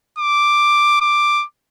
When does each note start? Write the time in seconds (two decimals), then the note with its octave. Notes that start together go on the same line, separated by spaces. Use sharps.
0.18 D6
1.01 D6